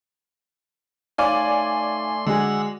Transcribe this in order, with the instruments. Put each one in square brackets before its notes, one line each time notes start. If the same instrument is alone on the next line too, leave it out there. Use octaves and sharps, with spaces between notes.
[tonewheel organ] A3 C6 [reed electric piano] D#4 C#5 F5 [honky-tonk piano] D5 G#5
[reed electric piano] D3 [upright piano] G#3 F#4 G#4 [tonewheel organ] F#5 E6